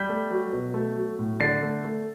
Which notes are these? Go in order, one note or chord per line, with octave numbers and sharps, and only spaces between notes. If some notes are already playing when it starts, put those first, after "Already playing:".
Already playing: G3 G6 B6
A3
F#3
B2
A3
F#3
A2
D3 A6 C7
A3
A3